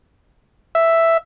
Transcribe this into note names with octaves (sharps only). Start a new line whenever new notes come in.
E5